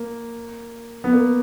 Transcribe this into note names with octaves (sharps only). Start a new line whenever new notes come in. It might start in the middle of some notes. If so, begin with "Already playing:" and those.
Already playing: A#3
B3
A#3